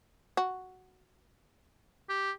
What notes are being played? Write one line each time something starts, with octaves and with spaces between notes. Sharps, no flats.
F#4
G4